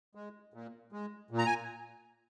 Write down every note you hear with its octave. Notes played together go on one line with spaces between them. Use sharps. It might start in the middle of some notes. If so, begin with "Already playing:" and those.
G#3
A#2
G#3
A#2
A#5
G#5